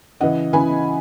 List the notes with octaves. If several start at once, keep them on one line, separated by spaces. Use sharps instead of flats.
C#3 E3 D#5 F#5
C#3 E3 G#5 B5